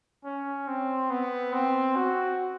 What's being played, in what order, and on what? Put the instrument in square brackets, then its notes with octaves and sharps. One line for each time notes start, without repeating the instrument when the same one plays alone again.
[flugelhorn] C#4
C4
B3
C4
F#4